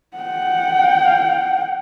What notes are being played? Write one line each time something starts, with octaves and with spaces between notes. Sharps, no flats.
F#5 G5